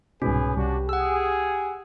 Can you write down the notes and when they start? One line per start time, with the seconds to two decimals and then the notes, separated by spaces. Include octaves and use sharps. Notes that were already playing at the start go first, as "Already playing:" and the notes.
0.22 C2 G#2 B2 C#4 G#4 B4
0.57 C2 D4 F#4 G4
0.89 G#4 F#5 E6